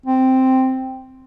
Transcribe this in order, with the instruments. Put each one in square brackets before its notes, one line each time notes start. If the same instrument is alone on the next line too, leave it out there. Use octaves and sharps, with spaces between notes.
[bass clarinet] C4